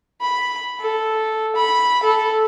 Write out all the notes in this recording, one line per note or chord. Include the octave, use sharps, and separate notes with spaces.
B5
A4
B5
A4